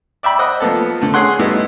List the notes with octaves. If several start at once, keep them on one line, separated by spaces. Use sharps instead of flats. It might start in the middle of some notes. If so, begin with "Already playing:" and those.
D5 E5 G5 B5
C5 D#5 F#5
F3 A#3 B3 A4
D3 A3
C#4 G#4 C#5 F#5 C6
G3 A3 B3 D#4 E4